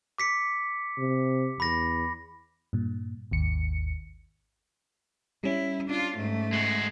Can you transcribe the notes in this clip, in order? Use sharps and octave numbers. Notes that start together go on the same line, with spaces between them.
D6 B6 C#7
C3
E2 B5 A#6
G2 A#2
G#1 D#2 C#7
G3 C#4 E4
D4 F4
G#2 A3
G#3 F#4